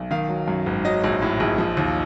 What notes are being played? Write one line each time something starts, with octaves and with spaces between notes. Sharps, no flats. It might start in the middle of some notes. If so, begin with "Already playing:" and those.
Already playing: B1
D#3 F5
F#3
F#2
G#1
F#3 D#5
A#1
A2
A#1
F3
D#2